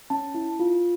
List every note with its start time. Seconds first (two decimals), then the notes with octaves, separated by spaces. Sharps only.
0.10 C#4 A5
0.34 E4
0.59 F4